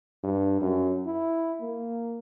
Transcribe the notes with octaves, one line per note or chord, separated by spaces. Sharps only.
G2
F#2
E4
A#3